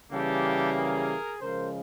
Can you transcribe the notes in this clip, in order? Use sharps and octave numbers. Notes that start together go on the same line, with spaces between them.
C#3 E3 G3 A#3 G4 A4
G#4 A#4
C#3 F3 G#3 A#4 C5